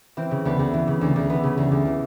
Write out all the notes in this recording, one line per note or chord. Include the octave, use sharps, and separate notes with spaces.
E3 C4
C#3
D2 B3
D2
E3
C#3
D2
D2
E3 B3
C#3
D2
D2
E3